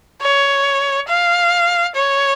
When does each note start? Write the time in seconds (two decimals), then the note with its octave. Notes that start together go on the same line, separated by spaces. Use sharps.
0.22 C#5
1.09 F5
1.95 C#5